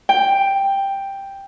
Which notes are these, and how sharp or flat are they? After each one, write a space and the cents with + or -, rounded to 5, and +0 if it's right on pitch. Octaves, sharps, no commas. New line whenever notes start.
G5 +5